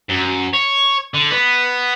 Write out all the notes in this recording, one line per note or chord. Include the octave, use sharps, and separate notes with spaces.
F#2
C#5
D3
B3